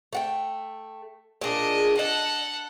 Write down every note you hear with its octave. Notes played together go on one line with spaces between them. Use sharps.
A3 F#5 G5
A#2 D4 G#4 D#5
A4 D#5 F#5 A5